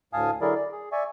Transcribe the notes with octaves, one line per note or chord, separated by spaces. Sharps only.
D2 A2 F5 G#5 A5 D#6
D3 F#3 E4 G#4 A#4 D5
D5
G#4
D5 E5 G#5 C#6